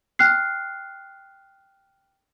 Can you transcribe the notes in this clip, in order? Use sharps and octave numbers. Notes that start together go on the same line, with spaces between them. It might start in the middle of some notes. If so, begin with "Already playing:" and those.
G5 F6 F#6 C7